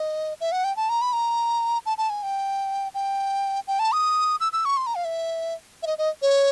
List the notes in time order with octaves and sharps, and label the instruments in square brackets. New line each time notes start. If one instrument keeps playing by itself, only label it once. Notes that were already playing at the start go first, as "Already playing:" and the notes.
Already playing: [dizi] D#5
E5
F#5
G5
A5
A#5
B5
A#5
A5
A5
G#5
G5
G5
G5
A5
D#6
E6
E6
C#6
C6
A#5
F5
E5
E5
D#5
D#5
C#5